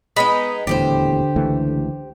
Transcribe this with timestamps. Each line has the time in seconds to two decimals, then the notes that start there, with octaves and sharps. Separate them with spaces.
0.16 G#3 B3 D#4 B5
0.67 D#1 E2 A2 D3 G4 G#4 C5
1.36 C#2 E3 A3